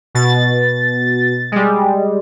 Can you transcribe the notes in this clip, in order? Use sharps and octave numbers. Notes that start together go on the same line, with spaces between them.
B2 A6
G3 G#3